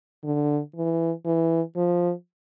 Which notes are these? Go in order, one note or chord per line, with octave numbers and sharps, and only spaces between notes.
D3
E3
E3
F3